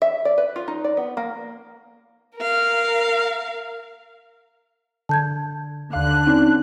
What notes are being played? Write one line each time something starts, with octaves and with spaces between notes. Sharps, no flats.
E5
D5
B4
F4
D#4
D5
B3
A#3
A#4 F5
D3 A5 G6 G#6
D#2 D3 F5 F#6
C4 C#4 D#4 A5